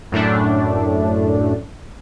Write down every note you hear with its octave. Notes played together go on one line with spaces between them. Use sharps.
F#2 A2 A3 D4